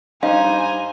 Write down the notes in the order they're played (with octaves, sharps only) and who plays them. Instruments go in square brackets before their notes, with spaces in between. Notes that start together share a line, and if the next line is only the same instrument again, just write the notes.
[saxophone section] G2 C5 [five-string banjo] D#4 [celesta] F5 [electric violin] G#5 A#5